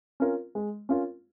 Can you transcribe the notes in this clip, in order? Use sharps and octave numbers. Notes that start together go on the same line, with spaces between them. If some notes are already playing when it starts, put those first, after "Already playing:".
C#4 F4 A#4
G#3
C#4 F4 A#4